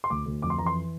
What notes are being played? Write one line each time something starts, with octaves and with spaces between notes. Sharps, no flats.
C6
D2 D6
D2
F2 D6
C6
E3 A#5
C6